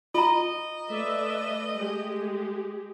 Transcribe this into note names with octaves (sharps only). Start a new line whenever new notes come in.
F4 D#5 A#5
A3 B4 D5 E5
G#3 G4 G#4